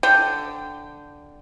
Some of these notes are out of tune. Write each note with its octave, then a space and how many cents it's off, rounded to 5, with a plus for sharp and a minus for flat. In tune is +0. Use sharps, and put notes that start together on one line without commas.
D3 +0 G5 +0